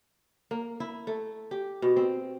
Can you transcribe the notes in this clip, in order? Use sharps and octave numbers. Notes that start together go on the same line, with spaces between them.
A#3
E4
A3
G4
B2
C4